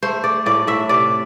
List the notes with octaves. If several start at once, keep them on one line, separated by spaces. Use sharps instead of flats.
A3 C5
A3 D5
A2 D5
A2 E5
C3 D5